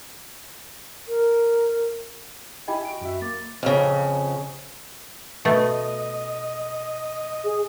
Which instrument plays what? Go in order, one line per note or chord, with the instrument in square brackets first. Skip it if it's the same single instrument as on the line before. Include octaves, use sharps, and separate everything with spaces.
[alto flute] A#4
[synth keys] E4 G4 G#5 [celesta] D#5 G5 B5
[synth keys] F#4 D7
F#2 F#4 E5
[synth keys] A#3 [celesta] D6 A6
[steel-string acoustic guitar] F2 C#3
[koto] B2 A3 [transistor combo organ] D#5
[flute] G#4